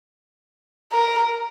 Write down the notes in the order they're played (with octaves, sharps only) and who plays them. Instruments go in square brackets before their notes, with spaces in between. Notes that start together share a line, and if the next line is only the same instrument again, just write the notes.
[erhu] A#4